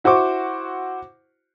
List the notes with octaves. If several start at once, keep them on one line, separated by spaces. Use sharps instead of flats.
E4 F#4 C5 C#6 D6